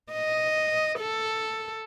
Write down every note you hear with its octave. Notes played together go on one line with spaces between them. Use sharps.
D#5
A4